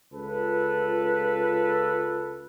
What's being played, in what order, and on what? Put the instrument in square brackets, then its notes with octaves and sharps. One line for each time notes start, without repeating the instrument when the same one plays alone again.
[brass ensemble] C#2 F4 A4 B4